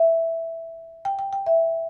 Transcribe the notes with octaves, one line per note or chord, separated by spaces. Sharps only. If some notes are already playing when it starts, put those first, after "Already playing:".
Already playing: E5
G5
G5
G5
E5